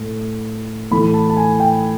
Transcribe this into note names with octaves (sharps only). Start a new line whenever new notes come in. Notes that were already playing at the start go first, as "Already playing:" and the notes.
Already playing: A2
A2 E3 B5
A5
A5
G#5
G5